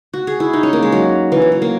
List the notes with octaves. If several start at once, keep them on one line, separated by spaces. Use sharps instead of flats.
F#4
G#4
E4
D#4
C#4
A#3
G#3
F#3
E3
F#3
F#3
A#3